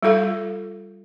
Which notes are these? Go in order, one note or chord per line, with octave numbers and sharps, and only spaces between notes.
G3 F4 A4 F5